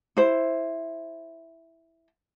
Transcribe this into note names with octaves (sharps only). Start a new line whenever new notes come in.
E4 C5